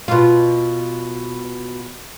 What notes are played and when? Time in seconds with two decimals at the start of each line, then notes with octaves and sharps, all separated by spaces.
0.08 B2 F4